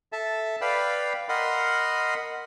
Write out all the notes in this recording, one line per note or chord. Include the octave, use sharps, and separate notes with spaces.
A4 E5 A5
B4 D5 F5 G5 B5
A#4 D#5 F#5 B5 C6